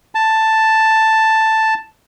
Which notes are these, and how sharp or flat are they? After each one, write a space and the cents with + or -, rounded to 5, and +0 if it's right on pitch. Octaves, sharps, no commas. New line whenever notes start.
A5 +5